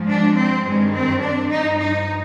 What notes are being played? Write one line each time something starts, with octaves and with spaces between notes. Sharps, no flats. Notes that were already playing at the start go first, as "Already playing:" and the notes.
Already playing: G#2 F3
D4
C4
G2 D#3 G#3
C4
D4
G2 F3 D#4
D#4